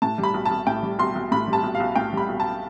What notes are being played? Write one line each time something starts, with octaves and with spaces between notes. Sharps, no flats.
A2 A5
G3
B5
B1
A5
B1
A2 G5
G3
B1 C6
B1
A2 B5
G3
A5
B1
F5
B1
A2 G5
G3 B5
B1
A5